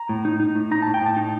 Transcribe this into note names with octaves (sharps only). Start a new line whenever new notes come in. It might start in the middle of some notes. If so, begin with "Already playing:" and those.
Already playing: A#5
A2
D#4
D#4
A2
D#4 A#5
A2 A5
G5
A2 A5
D#4